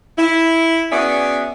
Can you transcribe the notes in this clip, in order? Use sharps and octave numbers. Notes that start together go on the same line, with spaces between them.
E4
B3 C#4 F#4 G#4 D5 E5